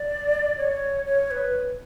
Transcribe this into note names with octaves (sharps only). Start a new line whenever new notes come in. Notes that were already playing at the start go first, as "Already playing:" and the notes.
Already playing: D5
C#5
C#5
B4